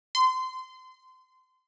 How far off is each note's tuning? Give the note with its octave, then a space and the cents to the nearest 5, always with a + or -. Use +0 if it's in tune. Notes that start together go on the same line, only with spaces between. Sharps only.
C6 -25